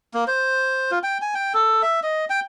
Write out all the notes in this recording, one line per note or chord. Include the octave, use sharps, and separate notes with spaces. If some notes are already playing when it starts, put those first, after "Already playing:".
A#3
C5
F4
G5
G#5
G5
A4
E5
D#5
G5